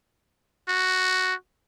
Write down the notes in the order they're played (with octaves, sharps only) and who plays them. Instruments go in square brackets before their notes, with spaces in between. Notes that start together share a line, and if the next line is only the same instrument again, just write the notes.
[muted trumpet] F#4